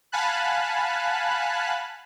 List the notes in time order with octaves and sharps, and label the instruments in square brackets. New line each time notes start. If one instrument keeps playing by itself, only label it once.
[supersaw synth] F5 F#5 G#5 A5 B5 F#6